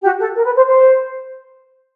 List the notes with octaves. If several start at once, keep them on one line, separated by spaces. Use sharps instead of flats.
G4
F#4
A4
A#4
B4
C5
C5